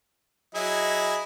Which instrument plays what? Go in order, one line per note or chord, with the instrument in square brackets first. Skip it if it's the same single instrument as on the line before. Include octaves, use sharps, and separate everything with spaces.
[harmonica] F#3 E4 G#4 [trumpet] D#5